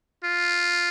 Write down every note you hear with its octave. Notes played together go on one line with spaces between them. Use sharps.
F4